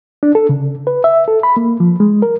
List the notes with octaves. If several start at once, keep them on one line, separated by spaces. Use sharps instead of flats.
D4
A4
C#3
B4
E5
A4
B5
A#3
F3
G#3
A#4